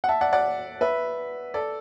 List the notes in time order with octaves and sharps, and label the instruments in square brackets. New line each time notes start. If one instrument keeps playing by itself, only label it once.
[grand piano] F#5
E5 A5
D5 F#5
D5 F#5
B4 E5
A4 D5